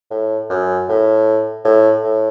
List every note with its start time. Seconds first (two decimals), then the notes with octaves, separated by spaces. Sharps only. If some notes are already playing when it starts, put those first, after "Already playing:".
0.11 A2
0.50 F#2
0.89 A2
1.65 A2
2.03 A2